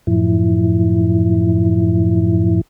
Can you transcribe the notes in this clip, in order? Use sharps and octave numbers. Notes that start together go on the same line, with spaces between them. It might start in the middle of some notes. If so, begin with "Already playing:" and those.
F#2 A2 F3 E4